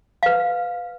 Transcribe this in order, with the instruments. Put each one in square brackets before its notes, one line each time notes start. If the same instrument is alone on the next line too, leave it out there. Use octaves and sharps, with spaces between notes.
[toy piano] B4 F5